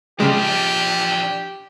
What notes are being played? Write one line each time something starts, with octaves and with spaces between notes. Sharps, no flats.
C#3 F3 G#3 D4 G4